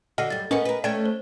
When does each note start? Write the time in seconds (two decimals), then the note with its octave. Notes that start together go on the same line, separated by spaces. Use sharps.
0.18 D3 F#4 D#5 F#5 F6 A#6 C7
0.30 F#2 G3 A6
0.51 B3 C#4 A#4 B4 D#5 F#5 G#5
0.65 A#4 B4
0.84 A3 C#4 D5 G5 G#6
1.06 C5